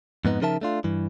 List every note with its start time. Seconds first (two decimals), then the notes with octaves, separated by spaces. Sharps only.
0.25 F2 G#2 B3 D#4
0.41 C#3 F3 D#4 A#4 E5 A5
0.61 A3 D4 F4
0.84 G2 E3